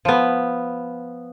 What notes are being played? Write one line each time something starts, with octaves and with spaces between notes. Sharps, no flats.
F3 B3